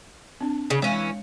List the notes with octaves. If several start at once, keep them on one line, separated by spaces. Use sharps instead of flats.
C4 D4
C#3
E3 G#3 C#4 C#5 F5